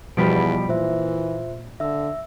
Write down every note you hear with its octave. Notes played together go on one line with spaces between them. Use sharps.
E2 B2 F3 G3 B5 B6 D7
A#2 E3 F4 C5 E5
D3 E5 E6